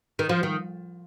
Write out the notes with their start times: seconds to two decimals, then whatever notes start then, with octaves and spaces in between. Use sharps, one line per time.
0.19 D#3
0.29 F3
0.43 D#3